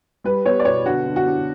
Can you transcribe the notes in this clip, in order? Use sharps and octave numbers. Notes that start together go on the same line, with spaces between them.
G3 B4
B3 C#5
D5
B2 C#5
D3 F#4
D3
F#4
D4